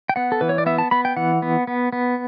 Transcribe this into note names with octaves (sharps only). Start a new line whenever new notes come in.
G5
B3 F#5
A4
E3 B4
C#5
D5
B3 E5
A5
B3 B5
G5
E3 F#5
B3
B3
B3